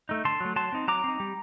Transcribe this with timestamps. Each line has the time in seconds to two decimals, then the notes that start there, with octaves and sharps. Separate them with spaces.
0.09 A3 D#4
0.25 D3 A5 C6
0.40 F#3 A3
0.56 F#3 A5 C6
0.72 C4 D#4
0.88 F#3 A#5 D6
1.04 C4 D#4
1.20 G3